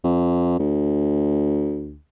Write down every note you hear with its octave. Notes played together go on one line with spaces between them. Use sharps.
F2
D2